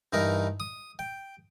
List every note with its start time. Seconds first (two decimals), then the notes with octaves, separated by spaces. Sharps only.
0.13 G2 E3 D#4 A#4
0.60 D#6
0.99 G5